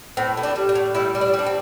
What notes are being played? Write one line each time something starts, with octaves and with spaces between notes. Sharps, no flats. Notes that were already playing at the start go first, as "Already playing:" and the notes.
A2 C4
A2
D4
G3
D4
A2
G3 E4
G3
D4
G3
D4
C4